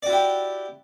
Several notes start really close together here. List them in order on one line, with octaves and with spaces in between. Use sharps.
D5 F#4 E4 G4